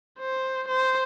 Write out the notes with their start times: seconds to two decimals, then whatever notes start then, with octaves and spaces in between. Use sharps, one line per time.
0.20 C5
0.68 C5